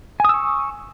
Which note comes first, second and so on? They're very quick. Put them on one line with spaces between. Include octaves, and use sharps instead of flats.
G#5 D#6 E6 C#6